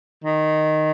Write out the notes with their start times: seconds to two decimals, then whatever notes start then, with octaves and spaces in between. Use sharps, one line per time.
0.24 D#3